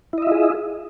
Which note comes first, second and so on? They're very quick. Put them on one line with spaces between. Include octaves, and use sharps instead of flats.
E4 D#5 E5 F4 G#4